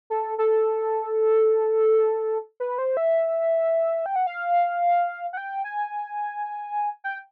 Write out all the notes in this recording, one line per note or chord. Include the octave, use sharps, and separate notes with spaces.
A4
A4
B4
C5
E5
G5
F#5
F5
F#5
G5
G#5
G5